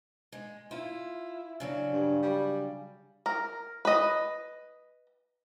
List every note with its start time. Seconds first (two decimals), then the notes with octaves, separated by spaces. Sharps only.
0.32 G#3
0.71 E4 F4
1.60 C#3 F#3 D4
1.93 G2
2.22 G3
3.26 A#4
3.85 B4 D#5